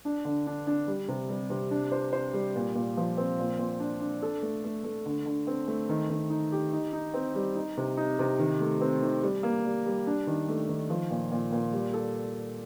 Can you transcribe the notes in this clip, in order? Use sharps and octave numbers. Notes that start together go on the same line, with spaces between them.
D4
D3
D4
D4
G3
C3
G3
C3
D4
C5
C5
G3
A#2
A#2
F3
C4
A#2
A#2
D4
D4
A4
A3
A3
A3
D3
D3
C4
A3
D#3
D#3
D#4
G4
D#4
D#4
C4
G3
D#4
C3
D#4
C3
D#3
A3
C4
D#3
G3
A#3
G3
G3
D4
D#3
A3
D#3
F3
A#2
A#2
A#2
G3
A4